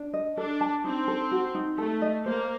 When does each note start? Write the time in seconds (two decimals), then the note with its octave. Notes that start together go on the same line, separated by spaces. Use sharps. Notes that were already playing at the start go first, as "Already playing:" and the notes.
Already playing: D4
0.14 D#5
0.37 D4 A4
0.61 A5
0.84 C4 D#4
1.08 A4
1.32 F#4
1.55 D#4
1.78 A3 A4
2.02 D#5
2.25 A#3 C5